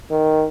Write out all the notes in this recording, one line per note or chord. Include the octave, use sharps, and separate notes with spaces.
D#3